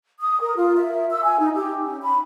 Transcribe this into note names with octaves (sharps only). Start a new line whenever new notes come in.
D#6
A#4
F4
E5
E6
G#5
D#4
G4
C#4
B5